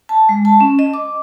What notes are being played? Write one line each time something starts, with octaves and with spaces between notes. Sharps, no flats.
A5
G#3
A5
C#4
D#5
D6